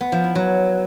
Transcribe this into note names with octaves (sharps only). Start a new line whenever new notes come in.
B3
F3
E4
F#3